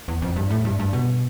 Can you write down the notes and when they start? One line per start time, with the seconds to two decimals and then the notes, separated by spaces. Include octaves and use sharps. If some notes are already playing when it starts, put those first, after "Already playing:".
0.08 E2
0.22 F2
0.36 G2
0.50 A2
0.65 G2
0.79 G2
0.93 B2